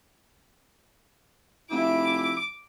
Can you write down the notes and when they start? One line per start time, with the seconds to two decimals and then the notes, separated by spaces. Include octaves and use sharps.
1.71 F1 E4 D6